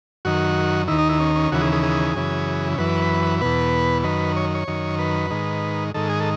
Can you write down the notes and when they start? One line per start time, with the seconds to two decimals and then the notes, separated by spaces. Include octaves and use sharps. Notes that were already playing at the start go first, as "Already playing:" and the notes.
0.25 F#2 D#3 F#4
0.88 D#2 D#3 E4
0.99 D#4
1.09 E4
1.20 C#4
1.36 C#4
1.51 D#2 C#3 E3 F#4
1.61 G#4
1.73 G#4
1.83 G#4
2.15 F#2 C#3 E3
2.78 F#2 E3 B4
3.41 E2 B2 B4
4.04 F#2 D#3 B4
4.36 C#5
4.55 C#5
4.68 F#2 D#3
4.99 B4
5.31 G#2 D#3
5.94 G#2 D#3 A4
6.09 G#4
6.20 A4